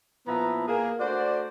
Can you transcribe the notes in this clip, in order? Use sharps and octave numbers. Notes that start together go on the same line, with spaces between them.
A#2 F3 B3 E4 B4 A#5
A#3 G#4
A3 D4 F#4 C5 D5